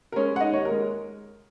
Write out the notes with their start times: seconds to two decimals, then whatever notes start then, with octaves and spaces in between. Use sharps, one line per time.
0.12 A#4
0.16 G#3 C#4 C#5
0.35 G#3 F#5
0.40 D#4 D#5
0.52 D#2 C#5
0.65 A#4
0.71 G#3